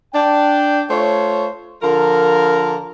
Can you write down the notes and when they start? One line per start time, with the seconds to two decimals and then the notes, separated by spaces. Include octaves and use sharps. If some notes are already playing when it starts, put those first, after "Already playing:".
0.14 D4 G5
0.89 A3 F4 C5 C#5
1.82 D3 F3 F4 A#4